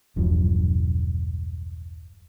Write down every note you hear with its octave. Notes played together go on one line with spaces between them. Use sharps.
E1 B1 G2 F3